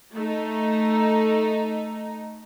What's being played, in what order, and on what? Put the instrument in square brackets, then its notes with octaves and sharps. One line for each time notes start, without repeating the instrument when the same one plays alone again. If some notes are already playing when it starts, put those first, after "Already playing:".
[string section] A3 D#4